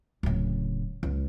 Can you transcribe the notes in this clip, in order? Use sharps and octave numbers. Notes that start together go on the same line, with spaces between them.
D1 C#3
C#2